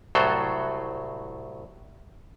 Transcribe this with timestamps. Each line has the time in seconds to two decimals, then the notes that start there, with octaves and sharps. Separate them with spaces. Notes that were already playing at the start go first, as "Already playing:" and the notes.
0.15 C2 A2 F#3 A4 C5